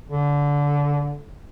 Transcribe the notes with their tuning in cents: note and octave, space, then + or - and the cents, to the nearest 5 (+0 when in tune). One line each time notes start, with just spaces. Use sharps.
D3 -20